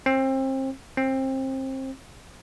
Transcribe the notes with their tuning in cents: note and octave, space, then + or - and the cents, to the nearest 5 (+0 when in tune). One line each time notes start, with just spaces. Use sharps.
C4 +30
C4 +25